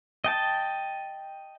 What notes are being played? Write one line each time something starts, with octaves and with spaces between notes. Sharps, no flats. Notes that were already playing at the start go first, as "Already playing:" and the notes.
D#5 G5 A5